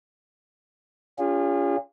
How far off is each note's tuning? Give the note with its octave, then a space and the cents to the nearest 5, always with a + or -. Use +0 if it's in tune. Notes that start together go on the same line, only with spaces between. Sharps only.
C#4 +35 F4 +0 G#4 -40